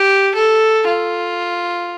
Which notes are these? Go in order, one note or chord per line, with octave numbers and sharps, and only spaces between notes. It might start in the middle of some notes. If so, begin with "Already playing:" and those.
Already playing: G4
A4
F4